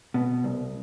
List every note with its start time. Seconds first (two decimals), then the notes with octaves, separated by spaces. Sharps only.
0.14 B2
0.44 C2